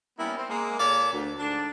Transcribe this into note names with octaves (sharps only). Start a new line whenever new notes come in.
G3 A#3 B3 C#4 E4
C4
G#3 A#3
A#2 F4 A4 C#5 D5
D2
G#2 D3 D4